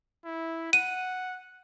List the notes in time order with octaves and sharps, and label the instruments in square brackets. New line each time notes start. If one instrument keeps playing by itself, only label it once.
[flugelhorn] E4
[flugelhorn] F#5 [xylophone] D#7